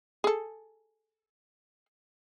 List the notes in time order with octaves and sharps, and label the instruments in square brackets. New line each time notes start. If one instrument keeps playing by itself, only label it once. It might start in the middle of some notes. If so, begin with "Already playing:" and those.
[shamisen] G#4 A4